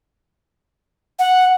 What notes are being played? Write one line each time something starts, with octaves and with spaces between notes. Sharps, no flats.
F#5